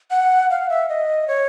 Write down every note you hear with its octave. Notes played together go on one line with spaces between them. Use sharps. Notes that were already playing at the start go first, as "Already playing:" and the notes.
F#5
F5
E5
D#5
C#5